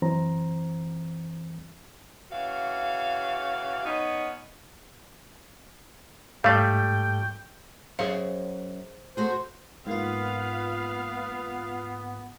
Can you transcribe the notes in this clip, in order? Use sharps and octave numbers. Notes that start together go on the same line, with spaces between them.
F#2 E3 C4 C5 A#5
C#3 E3 F#4 F5
B3 C#4 D#4
G#2 G3 A3 F5 G5
F#2 G#4 C5 F5
A3 F#4 G#4 C5
G#2 A#3 B3 F4 B4 F5